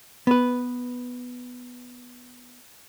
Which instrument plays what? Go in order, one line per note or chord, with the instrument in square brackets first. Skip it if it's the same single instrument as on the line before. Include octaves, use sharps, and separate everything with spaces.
[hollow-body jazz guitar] B3 B4